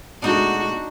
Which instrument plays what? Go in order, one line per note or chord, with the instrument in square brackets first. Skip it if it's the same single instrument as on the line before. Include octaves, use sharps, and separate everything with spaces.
[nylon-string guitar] B2 G#3 A3 [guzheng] D4 D#4 [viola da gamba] F#4